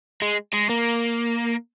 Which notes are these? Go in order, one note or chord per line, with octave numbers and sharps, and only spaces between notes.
G#3
G#3
A#3